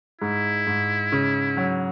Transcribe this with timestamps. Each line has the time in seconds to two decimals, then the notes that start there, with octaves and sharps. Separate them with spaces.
0.21 G#2 E4
0.67 G#2
1.12 C#3
1.57 F#3